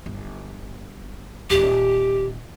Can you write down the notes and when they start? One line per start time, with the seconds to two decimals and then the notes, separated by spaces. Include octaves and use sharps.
0.06 G1
1.50 D#1 G4